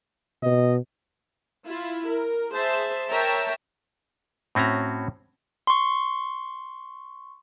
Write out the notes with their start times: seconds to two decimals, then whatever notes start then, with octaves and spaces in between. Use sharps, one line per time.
0.43 B2 D#5
1.66 E4 F4
2.07 A#4
2.51 G#4 C5 E5 A5
3.10 A#4 C#5 E5 G5 A5 A#5
4.55 A2 C4 C#4 F#4 A#5
5.67 C6 C#6